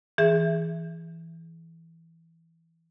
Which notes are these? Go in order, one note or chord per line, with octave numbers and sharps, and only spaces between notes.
E3 G#4 E5